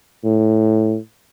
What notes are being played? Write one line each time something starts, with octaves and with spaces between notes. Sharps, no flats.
A2